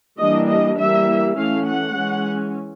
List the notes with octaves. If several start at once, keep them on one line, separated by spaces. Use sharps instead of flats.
E3 G3 A#3 D4 D#5
D#5
E3 G3 A#3 E5
E3 A3 C#4 F5
F#5
E3 G#3 C#4